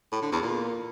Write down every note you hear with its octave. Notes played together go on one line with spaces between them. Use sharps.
A2
D3
E2
A#2